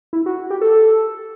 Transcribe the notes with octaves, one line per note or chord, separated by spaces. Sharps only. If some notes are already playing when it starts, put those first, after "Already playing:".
E4
F#4
G4
A4